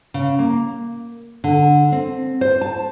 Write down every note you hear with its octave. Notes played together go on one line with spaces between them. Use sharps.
C#3
A#3
D3
C4
C5
A5